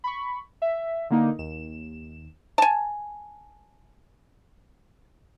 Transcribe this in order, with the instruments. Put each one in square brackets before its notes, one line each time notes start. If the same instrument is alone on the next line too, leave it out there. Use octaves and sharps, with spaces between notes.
[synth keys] B5 C#6
E5
D3 A#3 D#4
D#2 E7
[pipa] G#5 A5